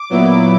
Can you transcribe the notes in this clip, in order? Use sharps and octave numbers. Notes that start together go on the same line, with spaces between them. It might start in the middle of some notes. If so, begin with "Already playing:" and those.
Already playing: D6
A#2 F#3 B3 E4